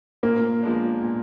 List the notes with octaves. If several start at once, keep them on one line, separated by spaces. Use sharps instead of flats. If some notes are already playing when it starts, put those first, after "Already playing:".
A#2 A#3
F3 G#3 B3 D4
A#2